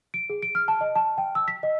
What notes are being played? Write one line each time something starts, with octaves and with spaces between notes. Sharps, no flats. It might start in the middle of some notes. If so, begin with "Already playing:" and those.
D7
G#4
D7
F6
A5
D#5
A5
G5
E6
B6
D#5